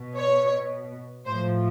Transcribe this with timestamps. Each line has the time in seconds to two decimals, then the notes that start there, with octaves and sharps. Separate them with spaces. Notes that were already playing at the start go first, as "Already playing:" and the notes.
Already playing: B2
0.17 C#5
1.26 A2 F3 C5